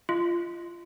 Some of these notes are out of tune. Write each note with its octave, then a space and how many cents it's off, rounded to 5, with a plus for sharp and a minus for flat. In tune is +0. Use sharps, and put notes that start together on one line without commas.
F4 -20 D#5 +0